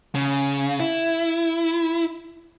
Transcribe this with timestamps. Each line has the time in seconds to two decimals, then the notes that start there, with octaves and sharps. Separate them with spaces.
0.15 C#3
0.80 E4